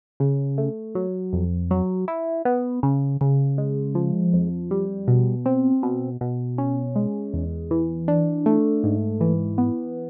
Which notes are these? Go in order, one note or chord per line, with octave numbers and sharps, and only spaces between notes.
C#3
A3
F#3
F2
F#3
E4
B3
C#3
C#3
G#3
F3
F2
G3
B2
C4
B2
B2
C#4
G#3
E2
E3
D4
A3
G#2
E3
B3